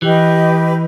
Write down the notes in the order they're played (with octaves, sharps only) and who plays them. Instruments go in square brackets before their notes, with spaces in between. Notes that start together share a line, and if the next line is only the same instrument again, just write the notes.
[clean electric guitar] E3 [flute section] G4 B4 D#5